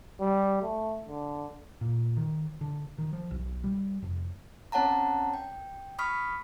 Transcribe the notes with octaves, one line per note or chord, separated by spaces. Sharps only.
G3
A3
D3
A#2
D#3
D3
D#3
F3
B1
G3
F1
C4 C#4 C#5 F#5 A5 A#5
G5
B5 C#6 D#6 F6 B6